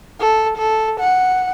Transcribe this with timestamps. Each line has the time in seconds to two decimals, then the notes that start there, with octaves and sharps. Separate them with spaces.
0.19 A4
0.57 A4
1.00 F#5